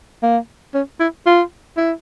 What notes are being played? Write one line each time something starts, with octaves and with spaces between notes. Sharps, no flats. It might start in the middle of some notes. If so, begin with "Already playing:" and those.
A#3
C#4
E4
F4
E4